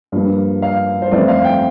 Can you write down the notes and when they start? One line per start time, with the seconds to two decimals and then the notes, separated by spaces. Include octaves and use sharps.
0.12 G2 F3 A#3
0.62 F5
1.02 C5
1.11 F2 E3 A3 C4 D5
1.28 F5
1.44 G5